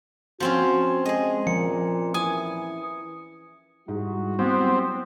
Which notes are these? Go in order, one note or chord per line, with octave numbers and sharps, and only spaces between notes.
F3 C4 C#4 F#4
G#3 G#4 D#5
A#2 F3 C#7
E3 G#5 D#6
G#2 G3 E4 F#4
F#3 B3 C4